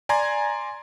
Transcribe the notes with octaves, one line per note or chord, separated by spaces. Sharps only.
D5 G#5 A#5 C6 G#6